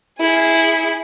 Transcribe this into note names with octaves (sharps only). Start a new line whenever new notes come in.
E4 G#4